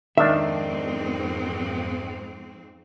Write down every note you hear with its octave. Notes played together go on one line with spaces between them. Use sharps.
F2 G#2 D#3 C4 D4 E5